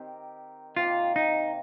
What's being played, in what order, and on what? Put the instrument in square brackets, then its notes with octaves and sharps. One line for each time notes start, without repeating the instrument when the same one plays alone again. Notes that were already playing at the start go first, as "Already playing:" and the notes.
Already playing: [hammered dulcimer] D#3 C4 G4 A#4
[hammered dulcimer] C3 D#3 A#3 [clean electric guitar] F4
[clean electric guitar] D#4